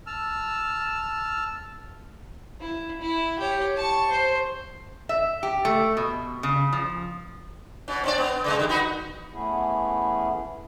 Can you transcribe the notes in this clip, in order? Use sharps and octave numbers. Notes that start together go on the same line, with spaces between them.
A5 E6 F6
E4
E4
G4 C#5
A5 C#6
C5
E5
G4
A3
B2
C#3
F3
B2 C#4
C4 D4 D5
B3
C#3 G3 G#3
D3 G3
D#4 F#4 B4
E3 A3 B3 C#4 E4 G#4